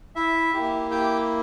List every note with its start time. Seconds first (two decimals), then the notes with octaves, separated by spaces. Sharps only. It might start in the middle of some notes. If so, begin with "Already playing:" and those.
0.16 E4 E5
0.53 A#3 E4 G4
0.91 G4 G5